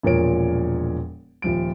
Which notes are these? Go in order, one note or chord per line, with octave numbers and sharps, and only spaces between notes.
E1 A#2 F3 A#4 C#5 D7
D#1 F3 D7